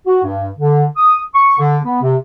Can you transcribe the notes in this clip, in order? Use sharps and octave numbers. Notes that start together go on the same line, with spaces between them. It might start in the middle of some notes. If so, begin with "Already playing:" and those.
F#4
G2
D3
D#6
C#6
D3
B3
C3